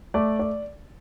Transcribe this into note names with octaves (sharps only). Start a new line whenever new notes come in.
A3 D5
D5